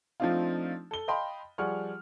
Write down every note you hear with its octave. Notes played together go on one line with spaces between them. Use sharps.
F3 A3 C4 D4 D#4 F4
A4 G7
D#5 F5 G5 A5 B5 C6
F3 G3 G#4 F#5 C#6 F6